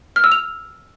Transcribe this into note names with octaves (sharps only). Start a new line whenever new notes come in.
F6
E6
F7